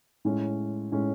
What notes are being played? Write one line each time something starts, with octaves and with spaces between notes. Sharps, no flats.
A2 G#3 C#4
A2 G#3 C#4